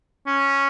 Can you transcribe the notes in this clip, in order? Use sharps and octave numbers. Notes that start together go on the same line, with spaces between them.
C#4